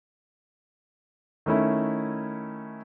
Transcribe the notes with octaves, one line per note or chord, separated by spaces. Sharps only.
D#3 A3 C#4 E4